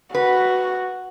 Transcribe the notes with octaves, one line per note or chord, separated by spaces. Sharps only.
F#4 B4